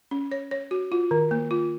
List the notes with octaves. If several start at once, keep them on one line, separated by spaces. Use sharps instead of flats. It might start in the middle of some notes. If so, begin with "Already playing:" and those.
C#4
C#5
C#5
F#4
F4
D#3
A#3
F4